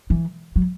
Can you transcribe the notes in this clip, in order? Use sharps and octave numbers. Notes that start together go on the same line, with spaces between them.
E3
F#3